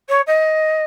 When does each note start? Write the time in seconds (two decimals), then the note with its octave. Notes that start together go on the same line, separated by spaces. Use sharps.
0.09 C#5
0.27 D#5